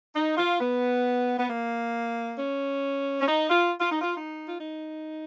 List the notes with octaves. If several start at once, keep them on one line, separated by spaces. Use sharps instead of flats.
D#4
F4
B3
B3
A#3
C#4
C#4
D#4
F4
F4
D#4
F4
D#4
F4
D#4